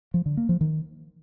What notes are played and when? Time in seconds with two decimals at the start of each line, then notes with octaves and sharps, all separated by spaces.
0.14 F3
0.26 D3
0.37 A#3
0.49 F3
0.61 D#3